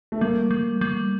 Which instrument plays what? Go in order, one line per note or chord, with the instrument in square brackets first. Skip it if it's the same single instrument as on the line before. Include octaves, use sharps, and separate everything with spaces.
[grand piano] A3
[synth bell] G3 [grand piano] A#3
[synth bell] G3
G3